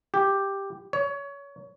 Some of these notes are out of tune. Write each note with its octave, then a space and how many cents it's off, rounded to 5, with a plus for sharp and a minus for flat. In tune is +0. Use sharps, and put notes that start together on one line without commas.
G4 +5
C#5 +25